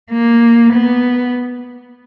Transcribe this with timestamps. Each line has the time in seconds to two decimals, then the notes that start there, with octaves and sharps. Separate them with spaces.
0.11 A#3
0.73 B3